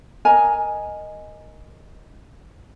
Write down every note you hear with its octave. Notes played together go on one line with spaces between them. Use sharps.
A#4 D#5 G#5 A#5